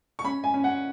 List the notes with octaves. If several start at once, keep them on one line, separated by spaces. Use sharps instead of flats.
C#6
C#4 B5
G#5
C#4
F#5